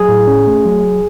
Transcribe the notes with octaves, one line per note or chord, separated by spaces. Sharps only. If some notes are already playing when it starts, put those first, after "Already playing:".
Already playing: F#3 G#4
A2
C#4
A3
F#3